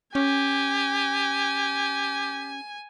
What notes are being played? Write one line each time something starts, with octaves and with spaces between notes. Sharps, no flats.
C#4 G4 G#5